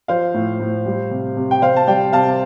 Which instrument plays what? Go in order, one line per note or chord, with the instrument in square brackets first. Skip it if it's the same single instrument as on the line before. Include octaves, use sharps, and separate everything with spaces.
[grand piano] F3 C5 F5
A2
A2
G3
C3
C3
G5
C3 C5 F5
A5
G3 D5 G5
C3 F5 A5